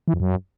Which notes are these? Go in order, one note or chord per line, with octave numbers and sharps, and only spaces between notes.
E3
F2
F#2